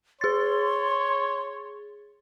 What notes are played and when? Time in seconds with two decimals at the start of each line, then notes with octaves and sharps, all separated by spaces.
0.21 G#4 C#5 C6 A6